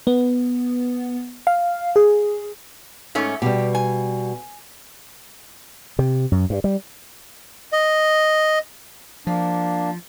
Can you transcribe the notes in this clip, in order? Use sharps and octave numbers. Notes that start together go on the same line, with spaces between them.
B3
F5
G#4
G#2 A3 C#4
B2 G3 G4
G#5
C3
F#2
G2
G3
D#5
F3 A#3 D4